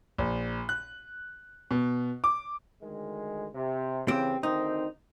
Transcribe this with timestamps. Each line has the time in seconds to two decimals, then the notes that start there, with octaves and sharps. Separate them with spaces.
0.18 A#1
0.69 F#6
1.71 B2
2.24 D6
2.82 D2 D#3 G#3
3.54 C3
4.08 C#3 E3 C4 G4
4.43 D2 D#3 C4 D#4